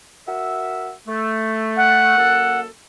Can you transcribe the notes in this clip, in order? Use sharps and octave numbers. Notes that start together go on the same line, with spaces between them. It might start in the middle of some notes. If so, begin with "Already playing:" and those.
F#4 A#4 E5
A3
F#5
F#2 A#3 A4